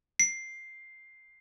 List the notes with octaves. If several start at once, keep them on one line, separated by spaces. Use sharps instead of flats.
C7